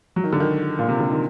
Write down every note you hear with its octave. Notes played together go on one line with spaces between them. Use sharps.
F#3
D#3
D3
D#3
A#2
C3
D3
D#3